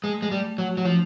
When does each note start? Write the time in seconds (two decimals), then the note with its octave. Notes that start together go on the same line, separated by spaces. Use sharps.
0.04 G#3 A3
0.22 G#3
0.30 G3 A3
0.58 F#3 F#4
0.77 F#3
0.85 F3 D4